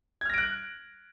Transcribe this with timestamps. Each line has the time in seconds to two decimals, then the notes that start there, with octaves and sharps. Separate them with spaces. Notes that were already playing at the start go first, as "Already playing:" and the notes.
0.21 G#6
0.25 F6
0.30 A#6
0.34 D7
0.38 F#6